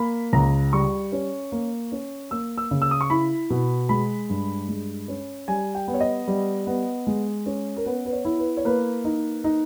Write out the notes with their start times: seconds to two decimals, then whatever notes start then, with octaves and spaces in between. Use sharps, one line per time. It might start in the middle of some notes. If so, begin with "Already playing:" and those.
Already playing: A#3 B5
0.33 C#2 A#5
0.73 G3 C#6
1.12 C#4
1.52 A#3
1.92 C#4
2.31 A#3 E6
2.58 E6
2.71 C#3
2.82 E6
2.91 D#6
3.01 C#6
3.10 E4 B5
3.50 B2
3.89 G#3 B5
4.29 G2
4.69 G#3
5.08 C#4
5.48 G3 G#5
5.75 G5
5.88 B3
5.94 C#5
6.01 D#5
6.27 G3
6.67 B3
7.07 G#3
7.46 C#4
7.76 A#4
7.86 B3 B4
8.05 B4
8.12 C#5
8.25 E4
8.38 B4
8.57 C#5
8.65 A#3 B4
9.05 D#4
9.44 D#4